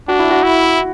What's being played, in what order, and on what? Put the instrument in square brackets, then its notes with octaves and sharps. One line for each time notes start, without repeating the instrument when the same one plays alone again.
[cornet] D4 [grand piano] F#4
[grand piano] E4
F#4
[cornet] E4